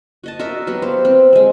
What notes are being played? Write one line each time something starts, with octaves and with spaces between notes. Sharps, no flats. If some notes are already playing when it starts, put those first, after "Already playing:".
F#4 D#5 A5
F#4 A#4 D#5 E5
F#3 B3 G4
C5 F5
C4
G#3 C4